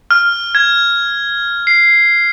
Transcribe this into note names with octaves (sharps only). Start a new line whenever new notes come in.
F6
G#6
C7